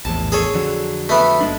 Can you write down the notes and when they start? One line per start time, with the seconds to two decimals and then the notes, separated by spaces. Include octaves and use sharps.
0.05 A#1 E2 A2 A5
0.32 G#4 A4 C#5
0.54 F2 D3 F#3
1.09 A3 B3
1.41 G1 G#3 D4